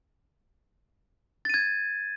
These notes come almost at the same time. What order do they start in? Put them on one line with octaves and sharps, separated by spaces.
A6 D#7 G#6